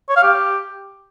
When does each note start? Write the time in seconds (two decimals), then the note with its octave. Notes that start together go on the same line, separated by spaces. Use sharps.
0.09 C#5
0.16 F5
0.24 G4